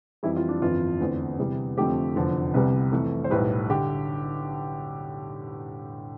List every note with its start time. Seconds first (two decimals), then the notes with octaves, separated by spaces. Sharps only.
0.23 F2 E3 G3 E4
0.36 F4
0.48 D4
0.62 G1 F2 E3 F4
1.00 E2 D3 A3 C4
1.39 E2 C3 E3 G3
1.77 F2 D3 F3 A3 C4 G4
2.16 F1 E2 D3 F3
2.54 C2 C3 G3 B3 B4
2.92 F2 E3 A3
3.24 C5
3.30 B1 A2 G3 B4
3.69 D3 G4